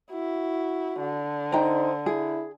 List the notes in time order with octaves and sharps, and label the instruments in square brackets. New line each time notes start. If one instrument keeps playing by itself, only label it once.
[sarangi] E4 [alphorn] F#4
[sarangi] D3
[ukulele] D#4 G5 A#5 [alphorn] C5
[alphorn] E4 [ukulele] G#4